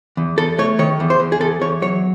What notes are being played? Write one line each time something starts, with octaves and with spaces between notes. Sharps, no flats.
E2
E2 A4
A3 C#5
D#3 C#5
E2
C5
E2
G#4
E2 A4
E2 C#5
F#3 C#5